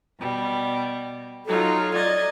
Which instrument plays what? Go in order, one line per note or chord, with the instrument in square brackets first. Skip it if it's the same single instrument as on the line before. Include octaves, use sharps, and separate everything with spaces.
[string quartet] B2 G3
[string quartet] F#3 D#4 F4 [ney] A4
[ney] D5 [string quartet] D#5 G#6 A6